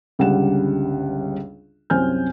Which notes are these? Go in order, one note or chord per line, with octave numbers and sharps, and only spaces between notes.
G1 C#2 D3 G3 F#5 E7
C2 F#2 C4 G#5 F6 G6